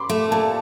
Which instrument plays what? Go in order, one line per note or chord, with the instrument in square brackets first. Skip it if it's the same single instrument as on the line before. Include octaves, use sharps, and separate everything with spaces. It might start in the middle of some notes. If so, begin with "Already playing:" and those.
Already playing: [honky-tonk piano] B5 C6 D6
[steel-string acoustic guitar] A3
[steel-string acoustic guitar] A#2 [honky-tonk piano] A5